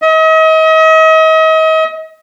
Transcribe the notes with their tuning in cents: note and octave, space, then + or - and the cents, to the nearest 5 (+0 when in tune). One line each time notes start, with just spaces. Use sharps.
D#5 +40